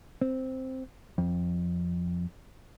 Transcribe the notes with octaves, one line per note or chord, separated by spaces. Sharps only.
C4
F2